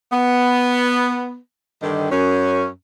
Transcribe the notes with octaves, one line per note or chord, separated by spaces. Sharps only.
B3
G2 D3 D#3
F#2 C#4